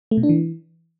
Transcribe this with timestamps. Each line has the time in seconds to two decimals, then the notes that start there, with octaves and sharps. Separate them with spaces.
0.11 A3
0.17 B2
0.23 D4
0.29 E3